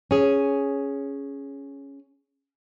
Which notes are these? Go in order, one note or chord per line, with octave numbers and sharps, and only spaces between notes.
C#4 G#4